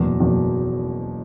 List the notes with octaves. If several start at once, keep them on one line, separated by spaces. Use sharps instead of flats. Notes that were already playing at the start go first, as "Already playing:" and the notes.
Already playing: F#1 E2 B2
F#1 E2 B2